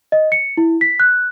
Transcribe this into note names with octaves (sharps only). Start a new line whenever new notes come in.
D#5
C#7
E4
B6
F#6